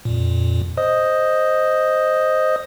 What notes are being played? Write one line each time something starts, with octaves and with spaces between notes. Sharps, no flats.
F2 A#2
C5 D#5 D#6